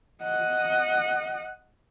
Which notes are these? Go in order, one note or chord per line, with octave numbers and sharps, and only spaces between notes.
D#5 F#5